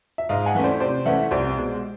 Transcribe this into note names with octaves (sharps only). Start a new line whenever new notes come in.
E5
G#2 D#5 F5
F#5 G#5
E3 A3 C#4
C5 D5
C3 C5 D5
E3 A3 C#4 E5 F#5
C2 C5 D5
B2 G#3